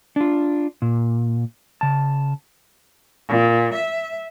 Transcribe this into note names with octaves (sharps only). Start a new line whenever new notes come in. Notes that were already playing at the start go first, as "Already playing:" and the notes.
D4 F4
A#2
C#3 A5
A#2
E5